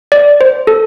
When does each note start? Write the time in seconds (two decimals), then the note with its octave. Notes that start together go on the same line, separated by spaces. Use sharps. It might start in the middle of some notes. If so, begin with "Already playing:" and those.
0.12 D5
0.41 C5
0.67 A4